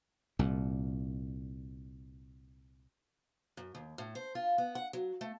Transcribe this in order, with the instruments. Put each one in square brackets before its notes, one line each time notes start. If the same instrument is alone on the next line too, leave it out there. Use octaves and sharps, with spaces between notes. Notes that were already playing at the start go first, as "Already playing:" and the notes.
[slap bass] C2 A#2
[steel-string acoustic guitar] F#2
D#2
A2
C5
F4
B3
F#5
F#3
A3